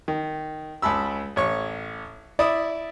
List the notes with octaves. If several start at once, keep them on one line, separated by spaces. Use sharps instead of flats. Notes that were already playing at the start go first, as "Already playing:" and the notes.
D#3
C#2 A5 B5 E6
A1 C#5 C#6
E4 D5 E5 B5 D#6